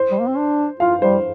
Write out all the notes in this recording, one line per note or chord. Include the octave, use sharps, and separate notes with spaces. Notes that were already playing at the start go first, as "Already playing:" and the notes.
Already playing: C5
G3
A#3
C4
D4
F4 F5
G3 C5